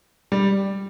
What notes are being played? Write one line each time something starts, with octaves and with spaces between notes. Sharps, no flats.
G3